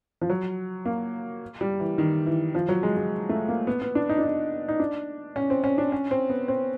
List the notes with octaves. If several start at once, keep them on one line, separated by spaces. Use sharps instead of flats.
F3
F#3
A#3
G3
E3
D#3
E3
F3
F#3
G#3
G#3
A3
A#3
B3
B3
D4
D#4
D4
D#4
D#4
D4
C#4
C4
C#4
D4
C#4
C4
B3
C4